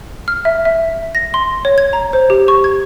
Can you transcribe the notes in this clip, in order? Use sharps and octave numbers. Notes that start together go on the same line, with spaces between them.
F6
E5
E5
A#6
C6
C#5
G#6
A#5
C5
G4
C#6
G#6